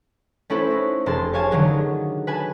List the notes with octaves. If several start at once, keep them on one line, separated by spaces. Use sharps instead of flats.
A3 C#4 E4 A4 B4 C5
D#4
F1 G#4 A5 C6 A6
C#5 F5 G#5 A5
D3 D#3 F#3 G#4
B4 G#5 A5